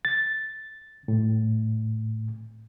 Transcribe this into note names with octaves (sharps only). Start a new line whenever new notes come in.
A6
A2